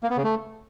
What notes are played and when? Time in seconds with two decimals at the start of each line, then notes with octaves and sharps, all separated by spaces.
0.03 A#3
0.10 B3
0.17 C#3
0.24 A3